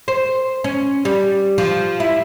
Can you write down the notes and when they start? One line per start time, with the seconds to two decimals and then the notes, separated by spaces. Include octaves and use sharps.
0.08 C5
0.64 C#4
1.05 G3
1.58 F3
2.00 E4